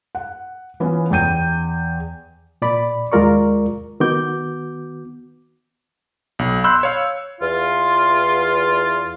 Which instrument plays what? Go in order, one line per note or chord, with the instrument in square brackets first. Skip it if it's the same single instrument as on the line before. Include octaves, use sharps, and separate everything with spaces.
[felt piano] F#5
E3 B3 C#4 F4
E2 G5 G6 D#7
[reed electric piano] A#2 D5 B5
D#2 G#3 F4 A#4 D5 C#6
D#3 B3 F#4 D6 G6
[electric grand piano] B1
B5 C6 E6 F#6 G6
C#5 F5
[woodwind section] E2 F4